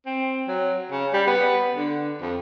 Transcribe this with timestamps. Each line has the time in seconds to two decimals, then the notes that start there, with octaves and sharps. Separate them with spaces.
0.06 C4
0.48 F#3
0.91 C#3
1.13 G3
1.27 B3
1.76 D3
2.21 F2